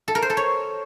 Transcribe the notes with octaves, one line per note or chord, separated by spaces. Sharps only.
A4
A#4
C5
A4
C#5